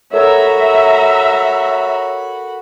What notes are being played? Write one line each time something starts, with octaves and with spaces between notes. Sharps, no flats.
F#4 A4 A#4 C#5 E5 A#5 B5